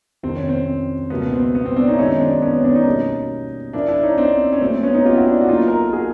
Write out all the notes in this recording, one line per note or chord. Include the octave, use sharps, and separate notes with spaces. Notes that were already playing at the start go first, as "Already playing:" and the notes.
F2 C3 D#3 C4
C#4
C4
C#2 B2 G3 A#3 B3
B3
C4
C4
B3
C4
C4 D4
C#4 D#4
E4
F#2 D#3 G#3 B3 C#4 D#4
C4 D4
B3 C#4
B3 C#4
C4 D4
C#4 D#4
B2 G3 A#3
A#2 F3 A#3 D4 E4
D4 E4
C#4 D#4
C4 D4
C#4
A#2 F#3 A3 C4
C4
B3 C#4
C#4 D#4
F4 G4
E4 F#4
D4 E4
F#4
A#2 F#3 A#3 D#4 F4
A#4
A4
F#4 G#4